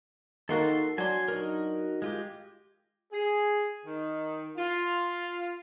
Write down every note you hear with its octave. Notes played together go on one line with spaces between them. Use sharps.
D#3 A#3 F#4 A4 C6
F#3 D4 G#5 C6
D#4 F#4 A#4
G#3 F4 G4
G#4
D#3
F4